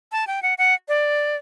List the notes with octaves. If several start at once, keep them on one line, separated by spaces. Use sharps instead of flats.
A5
G5
F#5
F#5
D5